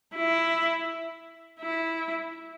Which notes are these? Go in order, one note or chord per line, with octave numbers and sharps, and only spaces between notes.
E4
E4